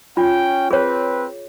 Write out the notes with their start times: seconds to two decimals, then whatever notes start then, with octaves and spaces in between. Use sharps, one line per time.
0.17 C#4 F4 G5
0.71 C4 G#4 B4 C#5